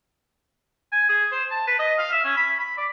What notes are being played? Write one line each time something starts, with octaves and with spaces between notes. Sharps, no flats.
G#5
G#4
C5
A5
B4
D#5
F5
E5
C#4
B5
B5
D5